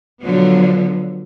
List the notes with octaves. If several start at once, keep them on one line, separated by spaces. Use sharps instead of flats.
B2 D3 F3 F#3 B3